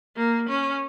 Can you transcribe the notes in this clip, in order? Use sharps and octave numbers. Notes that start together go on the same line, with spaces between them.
A#3
C#4